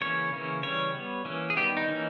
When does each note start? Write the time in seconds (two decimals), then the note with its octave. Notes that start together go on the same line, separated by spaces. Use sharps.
0.01 C#3 E3 A#3 C#4 C#5
0.33 C#3 E3 A#3 C#4
0.63 C#3 E3 G3 C#4 C#5
0.94 G3 B3
1.25 E3 A#3 C#4
1.50 G#4
1.56 D#3 G3 B3 G4
1.77 D#4
1.88 E3 A#3 C#4